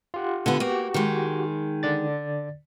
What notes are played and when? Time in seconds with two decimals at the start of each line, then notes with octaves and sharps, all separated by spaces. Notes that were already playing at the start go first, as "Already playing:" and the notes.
0.14 F4 G4 F#5
0.46 D3 B3
0.60 A#3 F#4 G4
0.94 D#3 G#3
1.83 D3 D5 A6